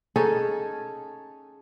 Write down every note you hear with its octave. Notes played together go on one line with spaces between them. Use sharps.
C#4 D#4 G#4 A4